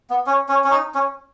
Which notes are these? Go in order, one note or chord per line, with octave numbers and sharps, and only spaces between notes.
B3
C#4
C#4
C#4
D#4
C#4